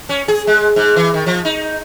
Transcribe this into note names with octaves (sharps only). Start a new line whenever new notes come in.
C#4
G#4
G#3
G#2
E3
D#3
F3
D#4